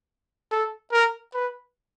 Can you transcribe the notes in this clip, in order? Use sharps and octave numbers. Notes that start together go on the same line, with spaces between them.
A4
A#4
B4